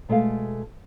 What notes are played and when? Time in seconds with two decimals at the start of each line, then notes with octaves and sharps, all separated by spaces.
0.09 B2 G#3 A3 A4 F5